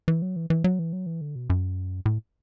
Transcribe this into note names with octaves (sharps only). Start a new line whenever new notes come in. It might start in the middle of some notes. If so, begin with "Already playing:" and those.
E3
F#3
E3
E3
F#3
E3
F#3
E3
D3
B2
F#2
A2